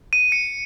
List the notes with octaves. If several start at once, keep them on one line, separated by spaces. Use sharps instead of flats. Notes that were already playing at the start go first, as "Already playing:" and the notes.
D#7
C#7